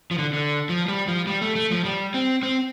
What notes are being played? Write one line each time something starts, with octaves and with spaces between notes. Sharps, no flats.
F3
D3
D3
F3
G3
F3
G3
A3
A3
F3
G3
C4
C4